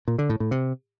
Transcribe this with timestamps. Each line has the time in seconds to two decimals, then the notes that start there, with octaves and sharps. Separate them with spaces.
0.08 A#2
0.18 D3
0.29 A2
0.40 A2
0.51 C3